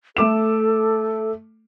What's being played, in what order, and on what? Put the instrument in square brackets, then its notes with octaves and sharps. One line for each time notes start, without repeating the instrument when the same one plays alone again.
[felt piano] A3 D6 E7 [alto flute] A4